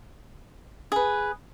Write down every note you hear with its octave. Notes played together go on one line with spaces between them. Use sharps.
G#4 B4